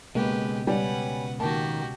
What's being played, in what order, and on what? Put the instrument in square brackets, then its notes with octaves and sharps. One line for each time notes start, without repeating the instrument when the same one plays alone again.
[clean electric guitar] C#2 B2 [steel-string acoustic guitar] G#3 [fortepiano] A#3 [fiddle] G4 B4
[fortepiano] G3 [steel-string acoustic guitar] C#4 [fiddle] B4 F#5
[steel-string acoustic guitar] D#3 A#3 [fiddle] F#4 G4 [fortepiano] A5